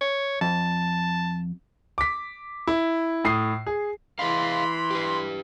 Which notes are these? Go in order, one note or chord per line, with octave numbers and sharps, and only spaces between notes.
C#5
F2 A5
D6 B6
E4
A2 D#6 C7
G#4
E3 G#4 D#5 F5 B5 C6
G4 B4